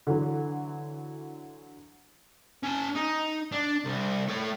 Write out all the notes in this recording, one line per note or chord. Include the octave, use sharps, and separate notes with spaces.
D3 E3 F#3
C#4 A5
D#4
D4
C2
A3 C#5